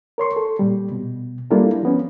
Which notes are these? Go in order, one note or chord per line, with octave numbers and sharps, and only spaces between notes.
A#4 C#5 C6 C#6
A4
A#2 G3
B2
G3 A#3 D4 E4 F4 A4
F3 B3 C#4